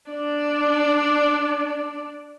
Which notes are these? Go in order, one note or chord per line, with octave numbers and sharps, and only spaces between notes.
D4 D5